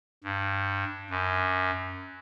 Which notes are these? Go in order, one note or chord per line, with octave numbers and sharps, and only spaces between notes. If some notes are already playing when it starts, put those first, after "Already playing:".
G2
F#2